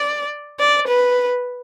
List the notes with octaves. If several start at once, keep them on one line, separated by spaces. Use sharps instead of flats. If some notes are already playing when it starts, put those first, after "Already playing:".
Already playing: D5
D5
B4